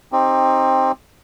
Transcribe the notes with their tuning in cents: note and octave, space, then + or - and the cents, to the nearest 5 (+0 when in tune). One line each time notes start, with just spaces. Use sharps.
C4 +15 D#4 +0 G4 +10